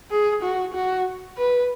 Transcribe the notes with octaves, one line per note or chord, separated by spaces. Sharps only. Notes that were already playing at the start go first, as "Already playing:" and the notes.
G#4
F#4
F#4
B4